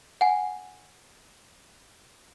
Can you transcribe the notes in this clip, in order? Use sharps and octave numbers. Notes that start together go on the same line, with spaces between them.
F#5 G#5